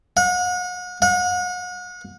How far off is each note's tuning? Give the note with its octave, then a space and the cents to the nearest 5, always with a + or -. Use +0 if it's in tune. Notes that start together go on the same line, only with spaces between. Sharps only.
F#5 -40
F#5 -40